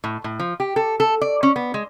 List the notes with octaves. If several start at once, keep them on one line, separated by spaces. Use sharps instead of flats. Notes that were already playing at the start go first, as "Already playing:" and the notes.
A2
A2
F3
G4
A4
A4
D5
C#4
B3
G#3